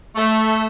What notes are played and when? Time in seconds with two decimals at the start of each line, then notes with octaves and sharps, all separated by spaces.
0.15 A3